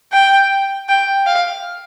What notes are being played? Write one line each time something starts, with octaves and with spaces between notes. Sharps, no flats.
G5
G5
F5